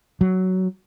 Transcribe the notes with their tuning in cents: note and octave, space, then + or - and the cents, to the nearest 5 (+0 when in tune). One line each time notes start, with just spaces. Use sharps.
F#3 +10